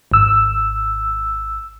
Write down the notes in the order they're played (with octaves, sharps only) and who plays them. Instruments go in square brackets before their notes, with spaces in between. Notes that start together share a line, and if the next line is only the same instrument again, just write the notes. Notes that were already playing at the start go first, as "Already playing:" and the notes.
[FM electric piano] G#1 E6